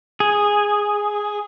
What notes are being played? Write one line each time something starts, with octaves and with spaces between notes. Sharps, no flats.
G#4